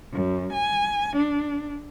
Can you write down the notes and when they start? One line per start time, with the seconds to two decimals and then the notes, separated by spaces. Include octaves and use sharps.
0.12 F#2
0.52 G#5
1.16 D4